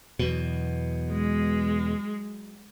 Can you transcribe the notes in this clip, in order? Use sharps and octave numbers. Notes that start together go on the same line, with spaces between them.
E2 B2 F#3
G#3